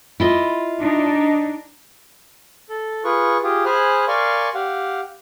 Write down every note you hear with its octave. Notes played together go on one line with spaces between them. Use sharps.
E4 F4 D#5
D4 D#4
A4
F4 G#4 B4 C#6
F4 G4 G#4
G#4 C5 G#5 B5 F6 F#6
A#4 D5 F5 G#5 C6 C#6
G4 F5 F#5